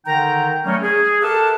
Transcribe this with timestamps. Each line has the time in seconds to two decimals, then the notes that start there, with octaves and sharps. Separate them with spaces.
0.05 D3 D#3 D#4 G5 A#5
0.64 F#3 G3 A3 A#3 C#4
0.82 G#4
1.21 G4 A4 A#4 E5 F#5 A5